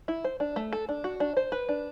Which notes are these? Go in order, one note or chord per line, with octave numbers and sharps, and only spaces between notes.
E4
C5
D4
A3
A4
D4
F#4
D4
C5
B4
D4